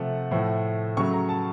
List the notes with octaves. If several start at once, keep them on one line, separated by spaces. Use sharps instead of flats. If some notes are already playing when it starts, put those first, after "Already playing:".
Already playing: C3 F3 A3 F#5
A2 F3 A3
C#3 F#3 A3 C#6
A#5
A5